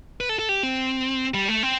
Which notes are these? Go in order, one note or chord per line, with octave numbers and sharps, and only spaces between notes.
B4
A4
A4
G4
C4
G3
A3
C4